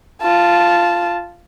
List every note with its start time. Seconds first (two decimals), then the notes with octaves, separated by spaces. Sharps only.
0.22 F4 A5